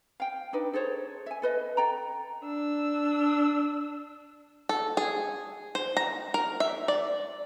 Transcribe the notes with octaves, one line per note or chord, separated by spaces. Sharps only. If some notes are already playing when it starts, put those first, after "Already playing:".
F5 G5
D4 D#4 B4
G#4 A4 C5 C#5
E5 G#5
A4 B4 D#5
A4 G5 A#5
D4 E6
A4
G#4
C5
A#5
A#4
E5
D5